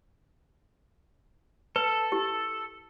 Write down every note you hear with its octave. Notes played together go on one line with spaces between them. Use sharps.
A4 B4
E4 G4